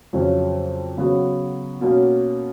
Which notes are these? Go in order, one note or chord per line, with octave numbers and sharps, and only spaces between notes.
F2 C#3 F#3 C#4
C#3 F#3 B3 F#4
B2 A#3 C#4 F#4